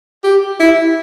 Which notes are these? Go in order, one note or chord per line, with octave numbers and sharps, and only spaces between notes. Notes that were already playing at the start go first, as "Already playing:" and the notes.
G4
E4